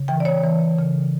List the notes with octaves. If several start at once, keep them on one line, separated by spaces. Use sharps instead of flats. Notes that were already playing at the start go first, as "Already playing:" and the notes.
Already playing: C#3
E3 G5
D5
C#5
E3
C#3